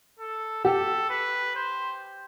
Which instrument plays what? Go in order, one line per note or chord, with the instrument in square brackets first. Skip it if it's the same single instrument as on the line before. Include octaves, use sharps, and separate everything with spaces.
[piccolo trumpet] A4
[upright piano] G4 [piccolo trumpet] A4
[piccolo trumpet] B4
C5